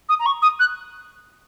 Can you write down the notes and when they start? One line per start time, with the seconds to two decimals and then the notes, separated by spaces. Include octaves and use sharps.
0.09 D#6
0.19 A#5
0.25 C#6
0.42 D#6
0.59 F#6